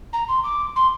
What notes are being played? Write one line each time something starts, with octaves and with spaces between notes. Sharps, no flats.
A#5
C6
D6
C6